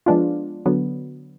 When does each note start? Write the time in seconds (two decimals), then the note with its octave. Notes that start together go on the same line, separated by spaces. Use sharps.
0.06 F3 G#3 B3 D4 F4
0.66 D3 F#3 B3